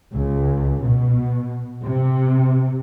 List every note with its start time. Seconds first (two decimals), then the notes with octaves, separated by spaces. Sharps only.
0.12 C#2
0.83 B2
1.84 C3